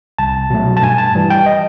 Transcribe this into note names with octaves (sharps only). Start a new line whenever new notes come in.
C2 A5
B2 F#3 A3
A5
G2 G#5
A5
E3 G3
G5
D#5